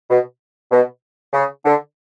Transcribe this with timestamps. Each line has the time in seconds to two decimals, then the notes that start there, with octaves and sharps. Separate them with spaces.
0.09 B2
0.71 B2
1.33 C#3
1.64 D3